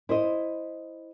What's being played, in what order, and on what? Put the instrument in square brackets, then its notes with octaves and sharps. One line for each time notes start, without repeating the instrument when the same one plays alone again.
[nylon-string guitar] E4 C5 D#5